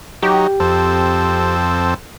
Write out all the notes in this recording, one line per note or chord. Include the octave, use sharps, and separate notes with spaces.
F#3 D#4 G4
F2 C4 A4